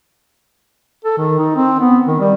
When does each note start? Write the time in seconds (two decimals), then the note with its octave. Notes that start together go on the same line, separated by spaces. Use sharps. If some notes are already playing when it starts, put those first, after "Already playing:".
1.05 A4
1.18 D#3
1.39 D#4
1.56 C4
1.80 B3
2.07 D#3
2.20 G3